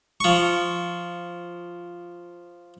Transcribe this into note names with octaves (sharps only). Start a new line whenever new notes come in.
F3 C#6